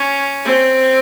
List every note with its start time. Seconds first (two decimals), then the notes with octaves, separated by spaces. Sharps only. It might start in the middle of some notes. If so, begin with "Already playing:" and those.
Already playing: C#4
0.45 C4